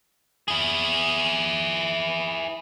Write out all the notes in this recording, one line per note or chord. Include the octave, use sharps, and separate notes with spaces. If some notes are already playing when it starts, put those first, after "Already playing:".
E4 G#4